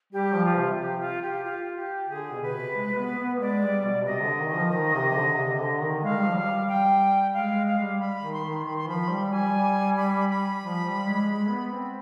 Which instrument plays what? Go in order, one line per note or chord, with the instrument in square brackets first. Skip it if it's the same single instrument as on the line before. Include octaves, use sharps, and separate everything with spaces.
[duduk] G3 [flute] G4
[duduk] F3
[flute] F4
[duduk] C3
[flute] G4
F4
G4
F4
G4
[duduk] D3 [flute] G#4
[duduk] B2
[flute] B4
[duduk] C3
G#3
G#3
B3
B3
[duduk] G#3 [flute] D5
[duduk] G3
B2
[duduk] C3 [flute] D#5
[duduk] D3
D#3
F3
D#3
C3
D3
C3
D3
D#3
[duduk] G#3 [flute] F5
[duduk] G3
F3
G3
[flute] G5
[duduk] G#3 [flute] F5
[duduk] G#3
[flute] F5
[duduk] G3
[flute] B5
[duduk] D#3
[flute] C6
[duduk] D#3
[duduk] D#3 [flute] B5
[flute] C6
[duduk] F3 [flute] B5
[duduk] G3
[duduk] G3 [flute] G#5
[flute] B5
B5
[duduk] F3
G3
G#3
G#3
B3
C4